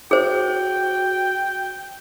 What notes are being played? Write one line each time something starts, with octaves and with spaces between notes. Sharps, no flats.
F#4 G#4 C5 G5